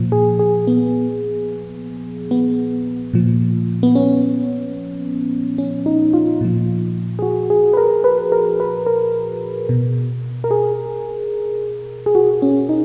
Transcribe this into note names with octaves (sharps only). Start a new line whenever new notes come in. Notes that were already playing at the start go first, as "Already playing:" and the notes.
Already playing: A#2 F3
G#4
G#4
B3
B3
A#2 F3
B3
C#4
C#4
D#4
F4
A#2 F3
G#4
F#4
G#4
B4
A#4
B4
A#4
B4
A#4
B2
A#4
G#4
G#4
F#4
C#4
D#4